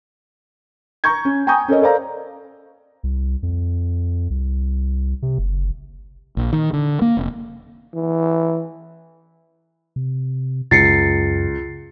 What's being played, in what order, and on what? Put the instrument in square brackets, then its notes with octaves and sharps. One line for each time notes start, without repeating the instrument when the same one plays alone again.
[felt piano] A#5 C#6 G6 G#6
C#4
G5 G#5 A#5 C#6 D#6 G6
C#4 A4 A#4 C#5 D#5
A4 A#4 C5 D5 F5 A#5
[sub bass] C2
F2
C2
C3
F#1
[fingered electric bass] A#1
D#3
D3
A#3
F1
[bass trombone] E3
[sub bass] C3
[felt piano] C#2 [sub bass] F#2 [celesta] A6 C7 C#7